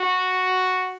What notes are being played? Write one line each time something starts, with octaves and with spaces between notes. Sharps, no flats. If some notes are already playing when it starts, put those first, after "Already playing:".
Already playing: F#4